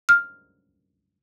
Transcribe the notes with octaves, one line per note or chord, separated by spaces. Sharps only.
F6